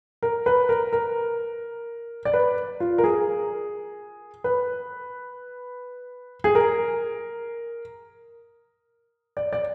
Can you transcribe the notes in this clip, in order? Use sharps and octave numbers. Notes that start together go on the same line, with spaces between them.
A#4
B4
A#4
A#4
D5
B4
F4
A#4
G#4
B4
G#4
A#4
D5
D5